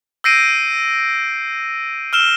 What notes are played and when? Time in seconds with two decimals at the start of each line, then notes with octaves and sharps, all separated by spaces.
0.24 E6 G6 A#6 C7 D7 D#7
2.13 E6 F6 E7 G7